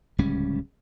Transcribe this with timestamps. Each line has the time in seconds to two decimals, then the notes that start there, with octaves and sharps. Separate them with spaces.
0.18 D1 C#2 G3 C#4